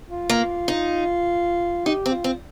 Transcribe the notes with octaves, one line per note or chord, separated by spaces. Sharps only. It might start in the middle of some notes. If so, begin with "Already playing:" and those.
F4
A#3
D#4
D#4 G4
C4
F4
C4